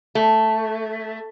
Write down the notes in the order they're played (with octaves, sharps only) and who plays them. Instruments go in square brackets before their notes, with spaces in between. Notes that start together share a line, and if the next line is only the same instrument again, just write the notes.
[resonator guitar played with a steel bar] A3